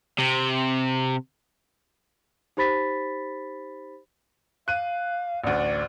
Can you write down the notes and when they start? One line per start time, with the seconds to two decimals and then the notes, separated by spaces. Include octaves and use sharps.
0.18 C3
2.57 D#4 G4 C5 B5 A6 B6
4.68 F5 F#6 D#7
5.44 A1 D2 D5